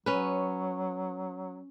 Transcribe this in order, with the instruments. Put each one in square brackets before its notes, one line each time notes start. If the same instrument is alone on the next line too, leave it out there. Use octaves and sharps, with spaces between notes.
[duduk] F#3 [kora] C#4 B4